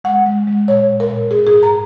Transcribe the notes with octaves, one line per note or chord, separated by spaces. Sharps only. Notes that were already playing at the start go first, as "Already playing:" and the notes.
G#3 F#5
G#3
G#3
A#2 C#5
A#2
A#4
A#2
G#2 G#4
G#4
G#2
A#5